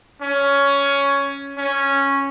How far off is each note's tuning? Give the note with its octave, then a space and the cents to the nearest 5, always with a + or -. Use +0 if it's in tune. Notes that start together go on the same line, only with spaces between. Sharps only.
C#4 +10
C#4 -5